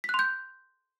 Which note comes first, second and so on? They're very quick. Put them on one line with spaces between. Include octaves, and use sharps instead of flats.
B6 F#6 C6 G6